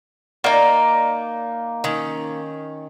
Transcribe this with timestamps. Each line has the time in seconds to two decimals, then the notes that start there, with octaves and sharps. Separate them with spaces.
0.44 A#3 D#4 D5
1.84 D#3 C#4